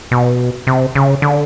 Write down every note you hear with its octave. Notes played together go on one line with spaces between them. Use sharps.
B2
C3
C#3
D3